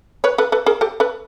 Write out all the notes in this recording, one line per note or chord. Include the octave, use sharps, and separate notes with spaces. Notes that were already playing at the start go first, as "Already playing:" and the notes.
B4 C#5
A4 B4
A4 B4
G#4 A#4
G4 A4
A4 B4